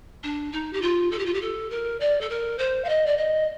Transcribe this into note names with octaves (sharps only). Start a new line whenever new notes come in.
D4
D#4
G4
F4
A4
G4
F4
G4
A4
A#4
D5
A4
A#4
C5
F5
D#5
D5
D#5